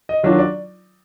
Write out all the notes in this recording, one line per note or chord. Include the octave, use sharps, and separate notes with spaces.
D#5
D#3 F#3 D4 F4
D5